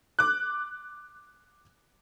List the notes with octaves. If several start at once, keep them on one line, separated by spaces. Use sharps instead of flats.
D6 F#6